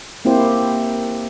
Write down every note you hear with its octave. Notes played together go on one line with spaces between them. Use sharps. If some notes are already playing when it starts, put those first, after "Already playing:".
A#3 C4 E4 G4 C5